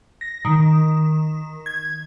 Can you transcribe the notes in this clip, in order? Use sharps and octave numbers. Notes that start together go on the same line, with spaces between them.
A#6
D#3
G#6